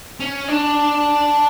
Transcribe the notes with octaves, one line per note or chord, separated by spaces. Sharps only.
C#4
D4